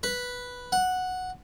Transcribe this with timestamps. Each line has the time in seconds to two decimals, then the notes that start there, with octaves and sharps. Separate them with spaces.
0.03 B4
0.72 F#5